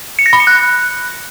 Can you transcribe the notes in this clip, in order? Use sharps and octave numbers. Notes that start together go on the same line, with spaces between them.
C#7
A#6
B5
C#7
F#6